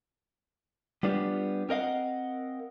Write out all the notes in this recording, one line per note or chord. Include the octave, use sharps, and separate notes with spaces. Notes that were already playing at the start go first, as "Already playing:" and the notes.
G3 B3 D4 F4 G4
C4 A#4 D#5 F5 F#5